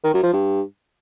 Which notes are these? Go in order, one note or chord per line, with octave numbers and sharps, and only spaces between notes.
D#3
F#2
F3
G2